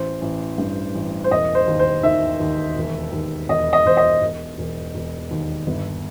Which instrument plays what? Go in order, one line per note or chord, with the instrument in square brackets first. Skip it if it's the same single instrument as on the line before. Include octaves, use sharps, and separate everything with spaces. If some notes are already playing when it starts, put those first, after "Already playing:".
Already playing: [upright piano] A1 C5
A1
G2
A1
C5
E1 D#5
C5
D#2
C5
D#3 E5
D#2
E1
D#2
E1 D#5
D#5
E1 C5
D#5
E1
E1
E1
D#2
G1